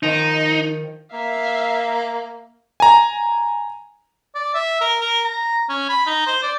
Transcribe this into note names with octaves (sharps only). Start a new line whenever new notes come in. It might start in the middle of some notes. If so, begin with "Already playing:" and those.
D#3 F3 D#4
A#3 E5 F5
G#5 A#5
D5
E5
A#4
A#4
A#5
C#4
B5
D#4
C5
D5